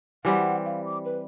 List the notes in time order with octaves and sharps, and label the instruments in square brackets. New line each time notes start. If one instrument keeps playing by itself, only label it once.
[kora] E3 G3 C4 [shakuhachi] F#5
[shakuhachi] F5
D6
B4